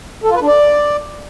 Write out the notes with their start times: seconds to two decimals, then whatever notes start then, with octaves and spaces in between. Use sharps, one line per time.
0.24 A4
0.30 F4
0.36 B4
0.42 D4
0.47 D5